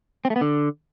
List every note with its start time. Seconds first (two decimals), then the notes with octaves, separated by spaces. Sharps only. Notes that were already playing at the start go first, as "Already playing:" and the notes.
0.25 C4
0.30 A3
0.36 B3
0.41 D3